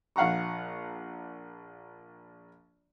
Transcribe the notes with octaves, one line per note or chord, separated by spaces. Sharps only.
A#1 F5 F#5 A#5 C#6